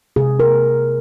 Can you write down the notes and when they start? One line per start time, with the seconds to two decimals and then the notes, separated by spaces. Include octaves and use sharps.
0.16 C3 G#4
0.39 A#4